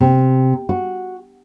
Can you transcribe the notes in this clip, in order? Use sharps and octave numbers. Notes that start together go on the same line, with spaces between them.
C3
F#4